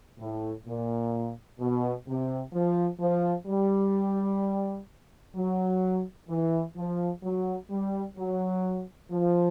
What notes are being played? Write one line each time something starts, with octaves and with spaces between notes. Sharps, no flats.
A2
A#2
B2
C3
F3
F3
G3
F#3
E3
F3
F#3
G3
F#3
F3